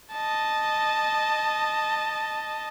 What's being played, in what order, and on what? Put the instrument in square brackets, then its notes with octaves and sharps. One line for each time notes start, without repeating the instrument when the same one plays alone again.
[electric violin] D#5 A5